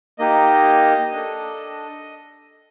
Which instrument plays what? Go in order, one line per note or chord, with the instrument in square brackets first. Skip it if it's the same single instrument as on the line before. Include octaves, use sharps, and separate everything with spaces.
[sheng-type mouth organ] A#3 D#4 G4 D#5
D4 A4